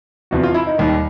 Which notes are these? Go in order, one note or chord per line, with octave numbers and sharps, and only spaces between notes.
E2 C3 F3 F#4
F4
E4
D#4
D#2 D#3 G3